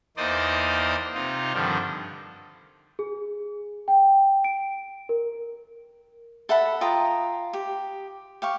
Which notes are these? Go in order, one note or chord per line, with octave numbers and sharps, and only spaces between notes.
E2 A#3 D#4 C5 D5 D#5
C3 D#4 F4
G2 D3 D#3 F3
G#4
G5
D7
A#4
A4 E5 F#5 B5
F4 G5 A#5 D#6
G4
G4 F5 C#6